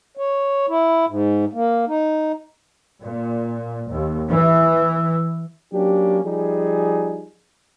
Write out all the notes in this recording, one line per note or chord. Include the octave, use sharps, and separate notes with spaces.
C#5
E4
G#2
A#3
D#4
A#2
D#2
E3
F#3 A#3 C#4 D4 G4
F3 G3 D#4 G#4